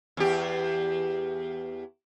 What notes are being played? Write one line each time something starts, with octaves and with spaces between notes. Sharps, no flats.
E2 G4